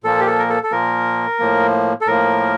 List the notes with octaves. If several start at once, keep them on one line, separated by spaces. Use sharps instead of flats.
A#2 F3 A#3 A4
G4
A4
A#4
A4
A4
A#2 F3 A#3 A#4
A2 F3 A#3
A4
A2 F3 A#3 A#4